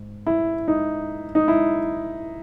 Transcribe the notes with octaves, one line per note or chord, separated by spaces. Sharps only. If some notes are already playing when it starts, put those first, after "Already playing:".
Already playing: G#2
E4
D#4
D#4
E4